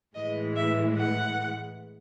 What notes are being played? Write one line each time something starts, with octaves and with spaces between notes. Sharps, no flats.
A2 E3 G#3 D#5
E5
F#5